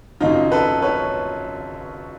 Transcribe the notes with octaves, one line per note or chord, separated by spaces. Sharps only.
G#1 F#2 C#3 F3 D#4 F4
A4 B4
B4 C#5